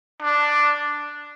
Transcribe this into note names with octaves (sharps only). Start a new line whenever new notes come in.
D4